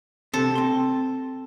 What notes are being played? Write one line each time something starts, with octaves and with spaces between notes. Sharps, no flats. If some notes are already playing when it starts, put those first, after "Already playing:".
C3 C4 A4
C4 C6